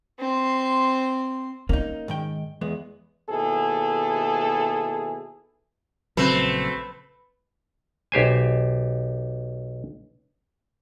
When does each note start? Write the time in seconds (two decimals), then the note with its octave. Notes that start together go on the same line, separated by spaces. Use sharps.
0.19 C4 C6
1.69 A#3 C#4 D#4
2.08 G#2 D#3 G5
2.61 E2 G#3 B3
3.30 D#2 B2 E4 G#4 A4
6.17 A#1 C#3 F#3 A3 C4 B4
8.12 B1 G4 C5 G#5